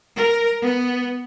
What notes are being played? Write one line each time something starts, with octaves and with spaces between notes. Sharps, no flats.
A#4
B3